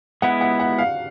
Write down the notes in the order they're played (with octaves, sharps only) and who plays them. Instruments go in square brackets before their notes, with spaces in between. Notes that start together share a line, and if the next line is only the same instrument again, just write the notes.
[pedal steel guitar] G#3 B3 E4 [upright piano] F#5
[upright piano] F#5
F#5
F5